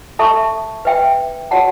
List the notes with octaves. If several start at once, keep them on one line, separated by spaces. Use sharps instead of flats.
A4 E5 A5 C#6
B4 E5 G5
F#4 C#5 F#5 A5